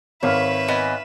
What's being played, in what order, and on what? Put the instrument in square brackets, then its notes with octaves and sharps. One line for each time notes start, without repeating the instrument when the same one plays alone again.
[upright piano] G#1 F5 F6 [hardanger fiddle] B4 E5 [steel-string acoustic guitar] C#5
[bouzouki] B3 D#5 G#5